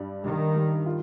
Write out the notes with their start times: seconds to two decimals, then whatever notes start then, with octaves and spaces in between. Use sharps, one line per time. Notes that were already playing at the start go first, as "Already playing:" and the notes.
Already playing: G2 G3
0.24 D#3 G3
0.55 G3
0.86 F4